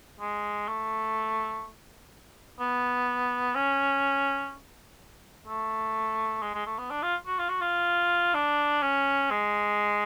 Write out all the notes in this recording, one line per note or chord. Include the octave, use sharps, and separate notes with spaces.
G#3
A3
B3
C#4
A3
G#3
G#3
A3
B3
D4
F4
F#4
F4
F#4
F4
D4
C#4
G#3